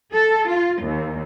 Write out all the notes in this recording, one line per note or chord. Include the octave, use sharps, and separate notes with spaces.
A4
F4
D#2